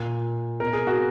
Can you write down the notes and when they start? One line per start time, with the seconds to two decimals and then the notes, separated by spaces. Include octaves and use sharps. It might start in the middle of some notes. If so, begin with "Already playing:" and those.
Already playing: A#2
0.60 B2 A#4
0.73 G#4
0.87 F#4